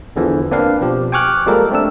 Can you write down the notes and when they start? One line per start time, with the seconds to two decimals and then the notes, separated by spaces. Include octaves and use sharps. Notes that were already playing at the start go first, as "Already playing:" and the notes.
0.16 E2 D3 E3 F3
0.51 A#3 C4 D4 B4 F5
0.81 B2 F3 G4
1.12 G5 G#5 C#6 D6 F6 F#6
1.46 F3 G3 G#3 A#3 A4 A#4
1.71 A3 C4 D4 E6